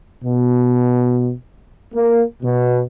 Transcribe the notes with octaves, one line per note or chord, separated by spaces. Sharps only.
B2
A#3
B2